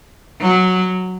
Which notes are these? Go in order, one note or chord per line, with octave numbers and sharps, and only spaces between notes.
F#3